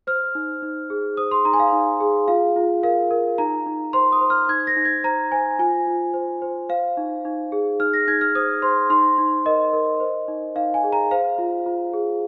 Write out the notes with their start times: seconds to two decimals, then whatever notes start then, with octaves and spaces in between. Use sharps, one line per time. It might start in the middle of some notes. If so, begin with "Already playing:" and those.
0.07 C5 F6
0.35 D#4
0.63 D#4
0.90 G#4
1.17 C5 D#6
1.31 C6
1.45 D#4 A#5
1.53 G#5
1.60 F5
1.73 D#4
2.00 G#4
2.28 F4 F5
2.56 F4
2.83 A#4 F5
3.11 A#4
3.38 D#4 A#5
3.66 D#4
3.93 C5 C6
4.12 D#6
4.21 C5
4.30 F6
4.49 D#4 G#6
4.67 A#6
4.76 D#4
4.85 G#6
5.04 C5 A#5
5.32 C5 G#5
5.59 F4 G#5
5.87 F4
6.14 C5
6.42 C5
6.69 C5 F5
6.97 D#4
7.25 D#4
7.52 G#4
7.80 D#4 F6
7.93 A#6
8.07 D#4 G#6
8.21 F6
8.35 C5 D#6
8.62 C5 C6
8.90 D#4 C6
9.18 D#4
9.45 A#4 D#5
9.73 A#4
10.00 C5
10.28 D#4
10.55 D#4 F5
10.74 G#5
10.83 G#4
10.92 A#5
11.11 C5 F5
11.38 F4
11.66 F4
11.93 G#4